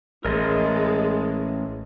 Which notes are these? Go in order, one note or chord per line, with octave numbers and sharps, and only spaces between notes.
A1 G#3 A#4 D#5 C6